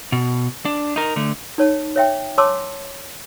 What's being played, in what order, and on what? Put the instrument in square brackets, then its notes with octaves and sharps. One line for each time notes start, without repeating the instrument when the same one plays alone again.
[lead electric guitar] B2
D4
D#4 A#4
D3 A3
[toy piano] D#4 C#5 A5
C#5 E5 G5
C#5 G#5 A5 C6 D6 E6